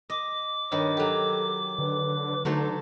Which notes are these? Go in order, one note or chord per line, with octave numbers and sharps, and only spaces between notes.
D#5 D6
G2 D#3 C#5 D#5
F#3 G4 A4
D3 B4
D3 F#3 A3 D#4 C5